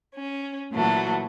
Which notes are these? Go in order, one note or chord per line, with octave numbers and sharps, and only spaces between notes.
C#4
A#2 E3 F#3 A3 F#4